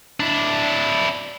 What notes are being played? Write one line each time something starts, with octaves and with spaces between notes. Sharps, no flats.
D4 E4